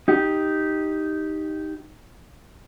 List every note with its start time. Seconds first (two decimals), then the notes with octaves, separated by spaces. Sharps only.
0.08 D#4 G4